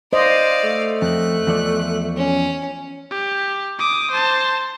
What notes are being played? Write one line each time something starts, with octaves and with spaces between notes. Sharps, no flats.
C5 D5 D#5 F5
A3
F2 F#6
E2 F3 D5
C#4
G4
D6 D#6
C5 A5